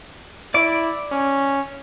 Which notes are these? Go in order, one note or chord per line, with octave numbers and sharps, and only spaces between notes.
E4 D5 D6
C#4